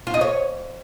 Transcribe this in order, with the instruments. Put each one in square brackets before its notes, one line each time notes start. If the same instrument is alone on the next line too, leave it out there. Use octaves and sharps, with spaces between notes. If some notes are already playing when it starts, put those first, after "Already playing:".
[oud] F4
D#5
C#5